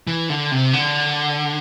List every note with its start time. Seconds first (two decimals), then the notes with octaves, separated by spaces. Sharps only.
0.07 E3
0.29 D3
0.51 C3
0.73 D3